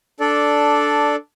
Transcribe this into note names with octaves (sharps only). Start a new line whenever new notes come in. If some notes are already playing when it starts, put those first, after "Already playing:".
D4 A4 D5